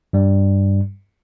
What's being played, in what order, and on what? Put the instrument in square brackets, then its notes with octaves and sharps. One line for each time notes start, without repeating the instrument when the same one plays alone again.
[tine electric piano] G2 G3